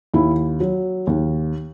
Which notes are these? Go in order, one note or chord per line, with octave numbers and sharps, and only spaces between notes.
D#2 E4
F#3
D#2